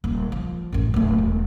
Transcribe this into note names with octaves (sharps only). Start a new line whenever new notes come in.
D#1
F3
A1 F#2
D1 A3
E1